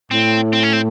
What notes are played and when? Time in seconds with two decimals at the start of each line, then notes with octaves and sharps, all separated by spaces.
0.11 A2 C4
0.53 C4
0.63 C#4
0.73 C4